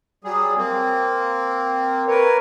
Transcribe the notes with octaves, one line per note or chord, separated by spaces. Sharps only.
F#3 G3 G#4
A#3 C4
A#4 B4 C#5